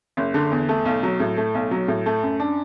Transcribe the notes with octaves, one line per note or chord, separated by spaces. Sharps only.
F#1
D3
E2
A3
B1
F#3
A2
A3
B1
F#3
A2
A3
F#2
D4